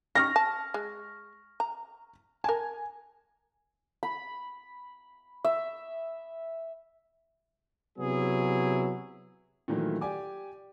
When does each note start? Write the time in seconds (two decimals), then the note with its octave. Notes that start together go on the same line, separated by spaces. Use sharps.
0.15 C#4 D#4 G4 C#6 F6 A#6
0.36 A5
0.74 G#3
1.60 A#5
2.44 A#4 G#5 A5
4.03 B5
5.44 E5
7.99 C3 F#3 B3 E4 G#4
9.68 A#2 D#3 E3 F#3 A3
10.01 G4 D5 G#5 D6